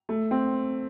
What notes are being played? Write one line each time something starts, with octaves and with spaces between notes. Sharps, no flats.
A3
C4